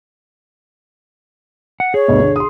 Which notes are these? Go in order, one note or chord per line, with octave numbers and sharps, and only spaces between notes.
F#5
G#4 C#5
D2 G2 B2
D3
C6 D#6